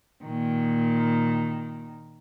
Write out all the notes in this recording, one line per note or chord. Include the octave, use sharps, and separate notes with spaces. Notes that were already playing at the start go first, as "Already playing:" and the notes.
A#2 D#3